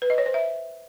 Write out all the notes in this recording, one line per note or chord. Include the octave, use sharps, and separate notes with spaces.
B4
D#5
C#5
C5
E5